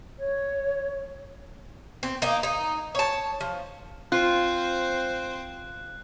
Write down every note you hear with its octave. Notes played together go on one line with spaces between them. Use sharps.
C#5
C4
A#3 D#4
D#4
C#5 A5
F3
C4 F4 C5 F#6